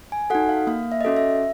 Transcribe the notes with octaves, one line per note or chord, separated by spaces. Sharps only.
G#5
D#4 F#4 A4 F#5
F5
A#3 F5
E5
D#5
C#4 F#4 A4 E5
E5